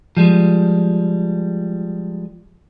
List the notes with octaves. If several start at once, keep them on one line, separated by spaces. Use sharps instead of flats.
F3 G3 G#3